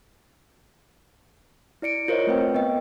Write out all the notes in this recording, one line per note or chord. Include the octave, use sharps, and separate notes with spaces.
E4 D5 C#7 D7
F4 A#4 C5 C#5 D#5 E5
A3 C4 B4 G5
B3 D#5 G5